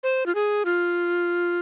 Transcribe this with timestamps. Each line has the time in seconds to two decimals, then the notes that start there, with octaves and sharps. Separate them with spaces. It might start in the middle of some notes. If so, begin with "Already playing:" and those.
0.03 C5
0.26 F4
0.35 G#4
0.65 F4